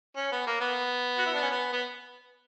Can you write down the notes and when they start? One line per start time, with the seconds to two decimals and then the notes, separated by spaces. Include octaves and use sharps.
0.16 C#4
0.32 B3
0.47 A#3
0.60 B3
1.18 F#4
1.26 E4
1.34 D4
1.42 C#4
1.50 B3
1.72 B3